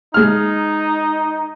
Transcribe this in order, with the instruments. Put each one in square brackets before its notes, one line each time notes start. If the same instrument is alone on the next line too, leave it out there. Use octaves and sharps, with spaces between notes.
[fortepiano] G#3 F6 [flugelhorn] D#4